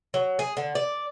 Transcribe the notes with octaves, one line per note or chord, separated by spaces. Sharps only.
F#3
G#4
D3
D5